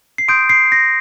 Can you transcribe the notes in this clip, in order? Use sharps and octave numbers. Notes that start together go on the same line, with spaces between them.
C7
C6 D#6 G6 D7
C7
A#6